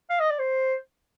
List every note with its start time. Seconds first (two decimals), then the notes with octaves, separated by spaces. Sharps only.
0.10 F5
0.20 D#5
0.30 D5
0.39 C5